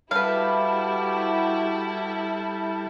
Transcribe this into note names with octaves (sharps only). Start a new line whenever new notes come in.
G3 E4 F#4 G4 A4 B4 F5